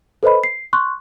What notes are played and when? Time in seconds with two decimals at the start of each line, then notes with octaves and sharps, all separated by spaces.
0.23 A4 B4 C5 D#5 B5
0.44 C7
0.73 C6 C#6 F#6